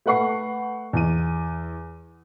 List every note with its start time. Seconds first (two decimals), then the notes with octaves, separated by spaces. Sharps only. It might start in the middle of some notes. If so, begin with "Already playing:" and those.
0.06 A3 B4 F#5 C#6 C7
0.93 E2 D#7